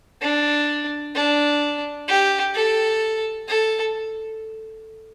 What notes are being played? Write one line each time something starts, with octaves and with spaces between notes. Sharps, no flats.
D4
D4
G4
A4
A4